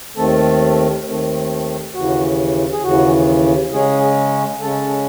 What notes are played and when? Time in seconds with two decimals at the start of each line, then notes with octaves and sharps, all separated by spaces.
0.16 D#2 D#3 A3 C4 A4
1.06 D#2 D#3 A3 C4
1.94 D#2 C#3 E3 F#4
2.72 G#4
2.83 D#2 C#3 E3 F#4
3.72 C#3 G#3 C#4 G#4
4.61 C#3 G#3 C#4 A4